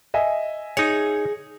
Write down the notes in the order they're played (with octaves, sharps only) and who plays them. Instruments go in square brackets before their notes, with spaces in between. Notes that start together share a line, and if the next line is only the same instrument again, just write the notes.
[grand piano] D#5 E5 G#5
[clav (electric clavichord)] D#4 C#5 [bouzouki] G#4